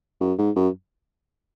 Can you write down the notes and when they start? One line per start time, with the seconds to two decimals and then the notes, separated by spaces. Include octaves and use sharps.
0.21 F#2
0.38 G#2
0.56 F#2